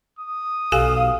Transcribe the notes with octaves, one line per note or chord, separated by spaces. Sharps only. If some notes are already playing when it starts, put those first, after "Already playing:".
D#6
B1 G4 A4 F5 G#5